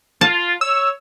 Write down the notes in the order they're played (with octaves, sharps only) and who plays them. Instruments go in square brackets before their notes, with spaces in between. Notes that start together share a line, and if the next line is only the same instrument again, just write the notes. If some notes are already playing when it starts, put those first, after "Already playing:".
[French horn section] F4 [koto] A5
[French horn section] C#5 [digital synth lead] E6